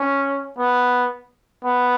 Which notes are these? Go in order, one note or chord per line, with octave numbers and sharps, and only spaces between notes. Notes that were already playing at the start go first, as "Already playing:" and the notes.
Already playing: C#4
B3
B3